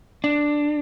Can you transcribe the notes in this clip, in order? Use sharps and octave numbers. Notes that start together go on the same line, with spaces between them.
D4